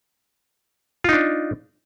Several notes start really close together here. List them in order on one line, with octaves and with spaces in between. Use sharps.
F4 D#4 D4